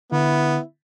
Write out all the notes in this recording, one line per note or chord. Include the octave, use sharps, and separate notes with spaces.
D3 B3 E4